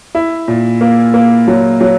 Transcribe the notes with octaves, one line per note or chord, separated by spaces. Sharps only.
E4
A#2
A#3
A#3
F#3
F#3